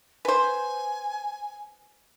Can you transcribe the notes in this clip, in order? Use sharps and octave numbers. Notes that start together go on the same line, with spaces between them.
B4 C5 G#5